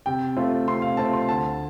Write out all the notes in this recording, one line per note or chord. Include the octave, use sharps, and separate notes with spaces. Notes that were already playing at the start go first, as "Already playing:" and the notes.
C3 G5
A3 C4 F4
C3 C6
F5
A3 C4 F4 A5
C6
D2 A5